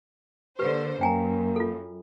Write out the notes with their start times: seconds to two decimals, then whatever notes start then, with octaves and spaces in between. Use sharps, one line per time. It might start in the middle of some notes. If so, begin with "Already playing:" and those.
0.59 D3 A#3 G4 B4 C5
1.01 F#2 A#3 G5 G#5 A#5
1.56 F4 A4